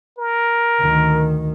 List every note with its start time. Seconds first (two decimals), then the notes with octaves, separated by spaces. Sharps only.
0.18 A#4
0.82 D2 D#3